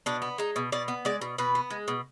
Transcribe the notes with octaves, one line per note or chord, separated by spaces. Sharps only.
B2 D4
B3
G#3 D#4
B2
B2 D5
B3
G#3 D5
B2
B2 B4
B3
G#3
B2